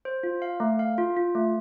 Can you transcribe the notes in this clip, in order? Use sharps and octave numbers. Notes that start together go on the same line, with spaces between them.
C5
F4
F5
A3
F5
F4
F4
A3